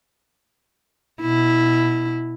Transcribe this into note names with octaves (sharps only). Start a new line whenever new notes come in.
B2 E4